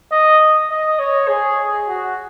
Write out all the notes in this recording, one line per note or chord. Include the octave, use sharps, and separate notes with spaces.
D#5
D#5
C#5
G#4
F#4